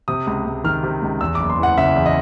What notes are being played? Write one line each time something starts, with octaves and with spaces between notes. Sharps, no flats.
C3 D#6
C#2
C#2
D#3 F6
C3
C#2
E2 E6
F#1 D6
C6
E3 F#5
C#3 E5
E2
D#5